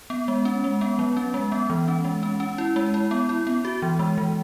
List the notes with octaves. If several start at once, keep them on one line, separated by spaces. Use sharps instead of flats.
B3
G#3
C#4
G#3
B3
F#3
C#4
G#3
B3
E3
C#4
G#3
C#4
C#4
E4
G#3
E4
B3
E4
B3
F#4
E3
G#3
E3